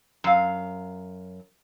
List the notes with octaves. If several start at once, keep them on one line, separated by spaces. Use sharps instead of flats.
F#2 F5